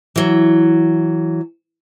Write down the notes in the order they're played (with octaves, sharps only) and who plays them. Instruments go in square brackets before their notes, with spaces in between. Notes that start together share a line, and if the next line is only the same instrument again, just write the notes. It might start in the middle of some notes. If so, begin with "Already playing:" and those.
[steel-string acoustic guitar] E3 F#3